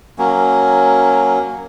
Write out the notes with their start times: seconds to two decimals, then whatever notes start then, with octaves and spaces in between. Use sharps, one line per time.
0.18 F#3 A#3 C#4